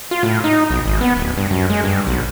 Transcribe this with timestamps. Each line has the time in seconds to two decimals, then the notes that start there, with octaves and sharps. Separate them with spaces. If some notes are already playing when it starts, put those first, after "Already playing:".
0.11 F4
0.23 A2
0.44 D#4
0.70 B1
0.84 G#1
1.01 B3
1.17 D1
1.37 G2
1.51 F#2
1.70 G#3
1.84 G2
2.07 B1